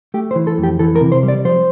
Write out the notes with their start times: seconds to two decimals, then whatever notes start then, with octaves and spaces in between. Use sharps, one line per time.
0.14 A3 G4
0.31 C5
0.35 E3
0.47 A4
0.58 F2
0.63 G4
0.79 E3 A4
0.96 A#4
1.01 C3
1.12 C5
1.23 G3
1.28 D5
1.45 F3 C5